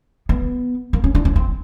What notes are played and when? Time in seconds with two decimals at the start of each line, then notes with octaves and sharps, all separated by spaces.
0.29 B3
0.93 A#3
1.04 C#4
1.15 D4
1.25 C#4
1.36 C4